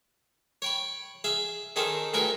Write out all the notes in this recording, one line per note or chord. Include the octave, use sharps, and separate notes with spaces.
C#5 G5 B5
G#4 E5 F5
D#3 C#4 D#4 G#4 A4 C5
D2 G2 G#4 A#4 B4 G#5